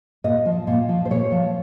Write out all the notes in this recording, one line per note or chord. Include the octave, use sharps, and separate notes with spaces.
A#2 D#5
F3
A#2
F3
C5
A#2 C#5
F3